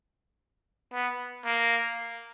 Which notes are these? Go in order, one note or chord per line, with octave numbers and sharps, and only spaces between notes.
B3
A#3